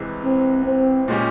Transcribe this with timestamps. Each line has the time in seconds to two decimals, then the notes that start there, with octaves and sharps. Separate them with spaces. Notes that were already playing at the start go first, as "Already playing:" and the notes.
Already playing: C2 C3 E3 G#3
0.24 C4
0.66 C4
1.08 A#2 G#3 C#4 G4